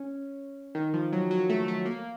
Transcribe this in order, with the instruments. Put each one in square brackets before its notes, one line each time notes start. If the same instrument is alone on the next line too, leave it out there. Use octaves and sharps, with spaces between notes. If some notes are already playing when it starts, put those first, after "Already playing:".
Already playing: [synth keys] C#4
D#3
F3
F#3
F#3
A3
A3
A#3